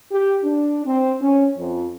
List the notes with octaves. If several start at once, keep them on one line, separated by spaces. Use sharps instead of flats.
G4
D4
C4
C#4
F2